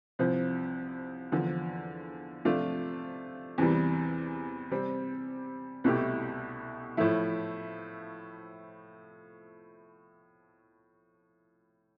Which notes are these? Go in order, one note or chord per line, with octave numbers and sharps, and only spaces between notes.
C2 C3 F3 C4
E2 D3 F3
C3 F3 A3 D4 F4
E2 C3 E3 G3
C3 G3 C4
C2 B2 A3 E4 G4
A2 F3 A3 E4